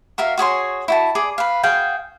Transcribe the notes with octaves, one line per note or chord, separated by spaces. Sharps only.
F#4 A#4 E5 F5
F#4 G#4 C#5 C6
E4 F#4 A5
G#4 D5
B4 F5
F#4 G#4 F5 G5